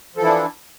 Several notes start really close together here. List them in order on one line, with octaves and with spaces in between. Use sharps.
F3 A4 E3 E4 D4